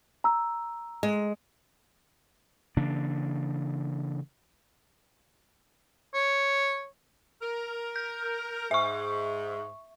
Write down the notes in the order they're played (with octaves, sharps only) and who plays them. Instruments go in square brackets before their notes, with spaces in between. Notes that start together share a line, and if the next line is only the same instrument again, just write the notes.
[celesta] A#5 E6
[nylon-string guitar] G#3
[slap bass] C#3 E3 A#3 D4
[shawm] C#5
[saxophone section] A#4
[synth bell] G6
[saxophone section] G#2 [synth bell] E5 C#6